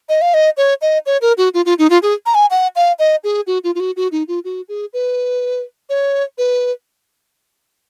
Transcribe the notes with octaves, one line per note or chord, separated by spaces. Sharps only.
D#5
F5
D#5
C#5
D#5
C#5
A#4
F#4
F4
F4
D#4
F4
G#4
A#5
G#5
F#5
F5
D#5
G#4
F#4
F4
F4
F#4
F#4
D#4
F4
F#4
G#4
B4
C#5
B4